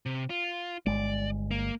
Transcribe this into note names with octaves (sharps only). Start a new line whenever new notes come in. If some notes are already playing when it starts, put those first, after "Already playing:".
C3
F4
G1 G#3 D5
A#3